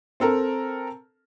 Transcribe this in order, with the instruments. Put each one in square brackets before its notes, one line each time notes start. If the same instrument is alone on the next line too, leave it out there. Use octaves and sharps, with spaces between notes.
[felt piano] C4 A4 A#4